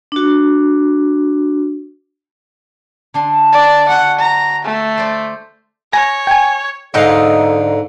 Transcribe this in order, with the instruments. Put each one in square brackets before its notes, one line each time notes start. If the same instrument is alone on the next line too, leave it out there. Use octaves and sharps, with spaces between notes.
[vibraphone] D4 F#4
[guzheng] D3 D4 C6
[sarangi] D5
[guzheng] F#4 [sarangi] F#5
[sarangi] A#5
A3
[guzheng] C5 D5
[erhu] C#5 [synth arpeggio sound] G#5 A#6
[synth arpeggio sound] G5 G#5
[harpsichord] G#2 F5 [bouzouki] D3 D#4 D#5 [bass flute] A4